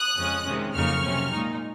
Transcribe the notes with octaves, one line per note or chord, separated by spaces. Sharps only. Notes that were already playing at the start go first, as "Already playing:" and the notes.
Already playing: D#6 F#6
F2 C#3 G#3 C#4
C3 D#3 G#3 C#4
F2 C#3 F#3 A#3 D#4 C#6 F6
C3 F#3 C#4
A#2 G#3 D#4